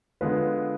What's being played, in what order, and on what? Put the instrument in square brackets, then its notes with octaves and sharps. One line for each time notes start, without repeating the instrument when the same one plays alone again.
[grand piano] D3 G#3 B3 F4 B4